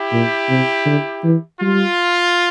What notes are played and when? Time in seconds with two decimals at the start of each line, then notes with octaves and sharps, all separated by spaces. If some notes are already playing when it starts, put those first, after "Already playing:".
Already playing: E4 G4
0.12 A#2
0.49 C3
0.86 D3
1.24 E3
1.61 G3 F4